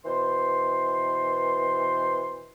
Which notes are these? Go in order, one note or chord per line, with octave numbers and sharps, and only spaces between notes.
B2 E3 C5 C6